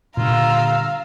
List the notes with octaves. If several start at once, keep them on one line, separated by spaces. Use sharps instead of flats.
A#2 D3 G3 F4 F5 A#5 E6